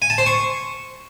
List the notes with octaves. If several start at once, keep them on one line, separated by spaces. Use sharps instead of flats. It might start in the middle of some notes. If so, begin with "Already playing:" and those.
G#5
A5
C5
C#6